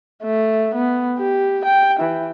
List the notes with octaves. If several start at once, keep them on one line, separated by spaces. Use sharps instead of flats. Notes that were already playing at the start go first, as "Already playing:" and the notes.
A3
B3
G4
G5
E3